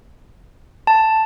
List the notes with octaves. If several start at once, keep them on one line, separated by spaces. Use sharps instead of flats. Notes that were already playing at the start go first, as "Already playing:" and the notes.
A5